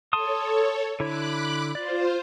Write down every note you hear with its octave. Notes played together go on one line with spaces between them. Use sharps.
A4 C#5 A5 C6 D#6
D3 E4 C#5 B5 D6 F#6
F4 C5 D5